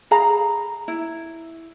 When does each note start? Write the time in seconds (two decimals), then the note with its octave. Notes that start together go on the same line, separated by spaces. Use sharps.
0.11 G#4 F5 A#5 B5
0.88 E4